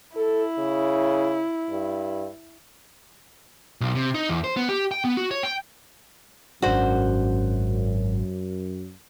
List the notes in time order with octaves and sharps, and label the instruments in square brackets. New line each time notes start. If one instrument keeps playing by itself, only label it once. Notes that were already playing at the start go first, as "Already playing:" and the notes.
[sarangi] E4 [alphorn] A4
[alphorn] C#3
G2
[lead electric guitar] B1
C3
D#4
E2
C5
B3
G4
G5
B3
F#4
C#5
G5
[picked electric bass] G#1 D4 [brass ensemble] F#2 [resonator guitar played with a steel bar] F#4 C5